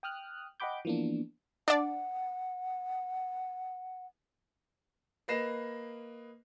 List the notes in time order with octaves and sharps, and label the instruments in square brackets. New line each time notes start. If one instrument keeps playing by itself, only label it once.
[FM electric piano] G5 D#6 F6 F#6
D#5 F#5 G5 B5 D6 G6
E3 F3 A#3 B3 D4
[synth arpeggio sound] D4 D5 [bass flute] F#5
[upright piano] A#3 B4 D#5 A#6 C7 E7